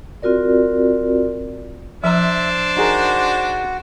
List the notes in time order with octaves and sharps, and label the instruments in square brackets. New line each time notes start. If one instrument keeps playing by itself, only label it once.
[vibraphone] C4 F4 F#4 A#4 D5
[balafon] F3 A#5 [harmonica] D4 C5 [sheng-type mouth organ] E5
[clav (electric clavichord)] D#4 G#4 A#4 [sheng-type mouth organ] F#4